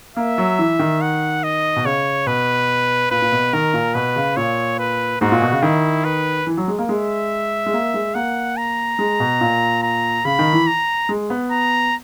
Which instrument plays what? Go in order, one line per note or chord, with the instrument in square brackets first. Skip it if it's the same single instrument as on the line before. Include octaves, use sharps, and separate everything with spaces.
[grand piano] A#3 [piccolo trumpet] E5
[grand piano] F#3
E3
D#3
[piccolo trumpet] F#5
D#5
[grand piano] B2
[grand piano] C#3 [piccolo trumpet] C#5
[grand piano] B2 [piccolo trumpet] B4
[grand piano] A#2 [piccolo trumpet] B4
[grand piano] A#2
B2
[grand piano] D#3 [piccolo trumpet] A#4
[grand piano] A#2
[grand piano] B2 [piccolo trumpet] B4
[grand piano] C#3
[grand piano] A#2 [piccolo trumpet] C#5
[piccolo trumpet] B4
[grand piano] G#2 [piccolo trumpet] F#4
[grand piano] A#2
B2
C#3
[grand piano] D#3 [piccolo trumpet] E4
[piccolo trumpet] B4
[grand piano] E3
F#3
G#3
A#3
[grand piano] G#3 [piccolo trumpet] E5
[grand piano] G#3
A#3
G#3
[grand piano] A#3 [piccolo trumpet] F#5
[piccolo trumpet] A#5
[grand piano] G#3
B2
A#2
[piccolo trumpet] A#5
[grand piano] C#3 [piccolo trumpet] B5
[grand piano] D#3
E3
[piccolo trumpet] A#5
[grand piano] G#3
B3
[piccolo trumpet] A#5